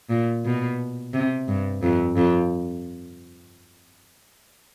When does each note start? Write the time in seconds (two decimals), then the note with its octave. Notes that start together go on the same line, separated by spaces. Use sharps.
0.10 A#2
0.45 B2
1.13 C3
1.48 G2
1.82 F2
2.17 F2